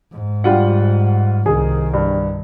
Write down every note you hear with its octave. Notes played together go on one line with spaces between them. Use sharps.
G#2
G3 F4 F#5
C2 D#3 G#4
G2